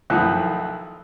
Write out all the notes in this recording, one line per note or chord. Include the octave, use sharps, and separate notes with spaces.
B1 D#3 F3 E4 F#5 F#6